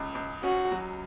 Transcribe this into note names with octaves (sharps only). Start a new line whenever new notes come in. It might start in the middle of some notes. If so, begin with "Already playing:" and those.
Already playing: C#2 C#3
C#2
C#4 F#4
F#3